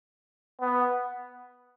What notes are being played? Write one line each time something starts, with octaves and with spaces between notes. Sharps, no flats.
B3